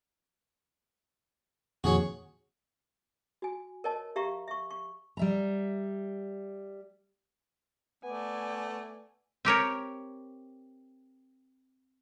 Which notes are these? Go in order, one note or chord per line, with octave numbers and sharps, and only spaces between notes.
F2 A#2 D#3 F#4 G#4 C#5
F#4 G#5
A#4 C#5 D#5 A5
G4 E5 F5 A#5 C#6
E5 C#6
C#6
G3 E5 A#5
A3 B3 D5 G#5
C4 G4 A#4 C#5